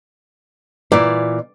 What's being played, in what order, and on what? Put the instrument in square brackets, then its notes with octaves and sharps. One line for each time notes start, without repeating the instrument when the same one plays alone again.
[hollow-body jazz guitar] A#2 E3 [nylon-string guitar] D5